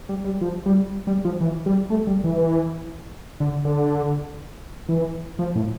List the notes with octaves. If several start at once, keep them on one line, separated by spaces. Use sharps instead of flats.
G3
G3
F3
G3
G3
F3
E3
G3
A3
G3
E3
D3
D3
E3
F3
A2